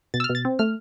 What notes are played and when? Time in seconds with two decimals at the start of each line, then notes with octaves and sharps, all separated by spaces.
0.14 B2 A6
0.20 E6
0.24 F6
0.30 B2
0.35 A6
0.45 C4
0.59 A3 F6